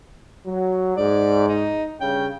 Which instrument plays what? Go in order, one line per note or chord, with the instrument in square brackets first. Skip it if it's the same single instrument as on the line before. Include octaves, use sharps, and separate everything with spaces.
[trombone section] F#3
[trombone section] G#2 [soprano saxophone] D5
[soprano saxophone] D#4
[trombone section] G2 C#3 [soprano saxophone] G5